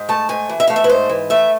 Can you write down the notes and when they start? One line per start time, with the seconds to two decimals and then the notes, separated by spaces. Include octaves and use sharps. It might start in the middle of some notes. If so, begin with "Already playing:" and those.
Already playing: G#2
0.09 A3 A5
0.29 G#2 G#5
0.49 E3
0.60 E5
0.67 A3 F5
0.76 E5
0.84 B4
0.89 G#2 C5
1.09 E3
1.30 A3 E5